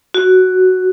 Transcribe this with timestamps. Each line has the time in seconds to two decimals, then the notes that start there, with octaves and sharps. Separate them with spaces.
0.14 F#4